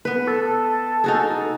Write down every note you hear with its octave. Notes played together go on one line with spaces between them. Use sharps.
B3 B4
A4
D#4 F#4 G#4